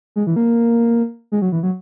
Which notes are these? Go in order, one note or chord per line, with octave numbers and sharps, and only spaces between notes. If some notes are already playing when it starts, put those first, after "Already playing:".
G#3
E3
A#3
G#3
F#3
E3
F#3